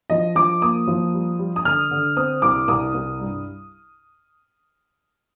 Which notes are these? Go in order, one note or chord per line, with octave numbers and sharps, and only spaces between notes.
F3 D#5
F3 D6
A#3 D#6
F3
G3
G3
D#6
D3 F6
D3
C4 D#6
C2 D6
C2 D#6
C2
G2